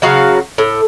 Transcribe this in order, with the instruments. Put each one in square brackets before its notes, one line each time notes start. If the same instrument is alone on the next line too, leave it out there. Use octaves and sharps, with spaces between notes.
[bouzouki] C#3 F#3 F#4 F5
A2